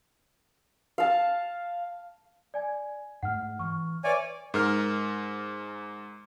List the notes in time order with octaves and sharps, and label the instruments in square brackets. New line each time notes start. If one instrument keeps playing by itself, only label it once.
[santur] F5 A5
[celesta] D5 G#5 G#6
[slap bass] G#2 A3 [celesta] F#5 F6
[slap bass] E3 [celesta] C#6 F6
[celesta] B4 E5 [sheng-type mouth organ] C#5 D5 G#5
[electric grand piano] G#2 A#4 F6